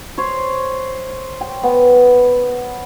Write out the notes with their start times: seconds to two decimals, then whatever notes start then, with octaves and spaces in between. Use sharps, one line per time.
0.18 C5 C#5
1.41 G5
1.63 B3